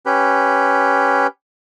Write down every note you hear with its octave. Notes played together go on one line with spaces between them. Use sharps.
C#4 G4 B4